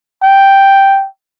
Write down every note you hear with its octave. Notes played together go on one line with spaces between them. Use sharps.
G5